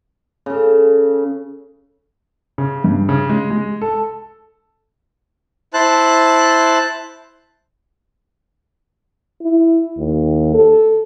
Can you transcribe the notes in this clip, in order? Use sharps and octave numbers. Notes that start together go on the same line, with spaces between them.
C#3 A4
C#3
G2
C#3
G#3
G#3
A4
E4 C5 A5 F#6
E4
D#2
A4